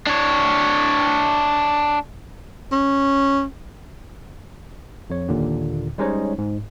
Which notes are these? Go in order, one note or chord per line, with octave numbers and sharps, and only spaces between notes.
D4 C#5
C#4
F2 C#5
D#2 A#2 D3
G3 G#3 C#4 D#4 C5 C#5
G#2